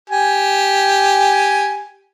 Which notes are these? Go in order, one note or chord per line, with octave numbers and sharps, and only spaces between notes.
G4 G#5